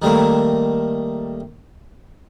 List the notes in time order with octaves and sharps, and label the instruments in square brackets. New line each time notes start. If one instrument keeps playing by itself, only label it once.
[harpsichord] D#3 G3 A3 A#3